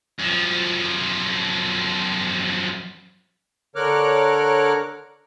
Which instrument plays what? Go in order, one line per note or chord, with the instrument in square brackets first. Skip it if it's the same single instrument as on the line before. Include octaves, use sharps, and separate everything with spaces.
[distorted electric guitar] F#2 F3
[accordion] D3 A#4 C#5 D6 F6 F#6